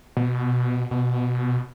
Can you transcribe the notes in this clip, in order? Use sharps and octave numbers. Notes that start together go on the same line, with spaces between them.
B2
B2